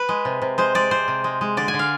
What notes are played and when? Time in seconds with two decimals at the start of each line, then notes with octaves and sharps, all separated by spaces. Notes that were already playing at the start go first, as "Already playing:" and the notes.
Already playing: B4
0.09 G#3
0.25 C3
0.42 C3
0.58 G#3 C5
0.75 G#3 D5
0.91 C3 C5
1.08 C3
1.24 G#3
1.41 G#3
1.57 D3 D5
1.68 G#5
1.74 D3
1.79 F5